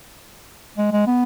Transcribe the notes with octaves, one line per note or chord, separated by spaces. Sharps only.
G#3
G#3
B3